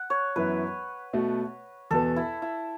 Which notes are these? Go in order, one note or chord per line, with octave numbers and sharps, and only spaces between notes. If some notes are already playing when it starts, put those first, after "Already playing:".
Already playing: F#5
C#5
F#2 E3 B3 E4 B4
B2 A3 F#4
E2 B2 B3 A4
E4
E4